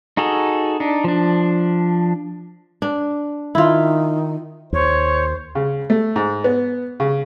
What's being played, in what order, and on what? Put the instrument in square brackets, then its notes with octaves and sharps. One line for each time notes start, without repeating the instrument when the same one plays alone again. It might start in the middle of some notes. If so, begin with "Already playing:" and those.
[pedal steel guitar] D#4 F#4 G#4 A4
D4 D#4
F3 D4
[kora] D4
[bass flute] D#3 [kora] E4 F4
[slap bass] D#2 [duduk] C5 [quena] C#5
[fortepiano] C#3
A3
G#2
B3
C#3